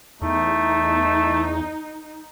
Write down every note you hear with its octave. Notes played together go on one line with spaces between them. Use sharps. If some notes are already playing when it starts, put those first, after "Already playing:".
E2 A3 D#4